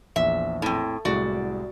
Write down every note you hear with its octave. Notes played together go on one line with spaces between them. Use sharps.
A#1 E2 E5
A2 C4
C2 A2 G#3 F#4 D5